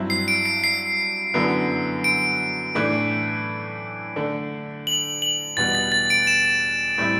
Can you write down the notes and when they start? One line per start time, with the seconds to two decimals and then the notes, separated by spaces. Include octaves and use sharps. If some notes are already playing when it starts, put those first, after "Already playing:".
Already playing: G2 F#3 C4 E4
0.10 C7
0.28 D7
0.46 C7
0.64 C7
1.34 F#2 D3 F#3 B3 E4
2.04 D7
2.75 A2 E3 A3 D4
4.16 D3 A3 D4
4.87 F#7
5.22 F#7
5.57 E2 B2 G3 B3 A6
5.75 A6
5.92 A6
6.10 D7
6.27 E7
6.98 A2 G3 C4 E4